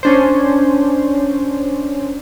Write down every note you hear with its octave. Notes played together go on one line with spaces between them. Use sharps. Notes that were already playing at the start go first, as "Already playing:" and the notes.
C#4 D4 C5